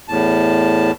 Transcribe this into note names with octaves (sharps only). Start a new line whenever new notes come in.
E2 A2 A5